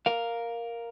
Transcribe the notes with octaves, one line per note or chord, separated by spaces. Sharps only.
A#4 F5